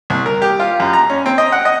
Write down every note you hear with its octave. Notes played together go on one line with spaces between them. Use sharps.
C2
A#4
G4
F4
F#2
A#5
C#4
C4
D#5
F#5
D#5